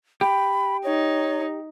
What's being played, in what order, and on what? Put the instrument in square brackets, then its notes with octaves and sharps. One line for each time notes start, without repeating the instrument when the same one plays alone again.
[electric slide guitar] G4 G5 [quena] B5
[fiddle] D#4 [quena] C#5